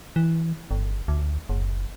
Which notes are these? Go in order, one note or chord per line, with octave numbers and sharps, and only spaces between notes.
E3
G1
D2
F#1